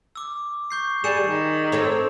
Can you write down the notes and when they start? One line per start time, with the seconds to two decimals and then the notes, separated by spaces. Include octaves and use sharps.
0.15 D6 E6
0.71 C#6 G6 C7
1.04 G3 G#4 G6 C#7 E7
1.23 D#3
1.72 C4 A4 C#5